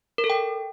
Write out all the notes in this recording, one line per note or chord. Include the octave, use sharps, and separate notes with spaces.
A#4
A4
G5